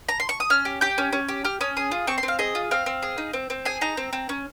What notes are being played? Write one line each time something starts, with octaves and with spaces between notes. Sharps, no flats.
A#5
C6
C#6
D#6
C#4 F6
G4
G4 G6
C#4
C#4
G4
G4 F6
C#4 D#6
G#4 D#6
F4
C4 C#6
C6
C4
F5
G#4 D#5
F4
C4 F5
C4
G#4
D#4
C4
C4
G#4 G#5
D#4 A#5
C4
C4
C#4